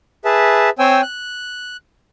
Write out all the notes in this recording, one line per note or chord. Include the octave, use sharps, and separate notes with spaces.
G#4 B4 E5 A5
C4 C5 C#5 G5 G#5 E6
F#6